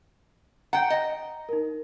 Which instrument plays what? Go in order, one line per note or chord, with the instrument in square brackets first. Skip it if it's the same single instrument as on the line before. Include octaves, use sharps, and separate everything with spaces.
[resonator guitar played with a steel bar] F#5 G5 [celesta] A#5
[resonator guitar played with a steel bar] D#5
[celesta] D#4 A#4